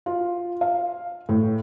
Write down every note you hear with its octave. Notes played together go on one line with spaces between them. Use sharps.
F4
F5
A2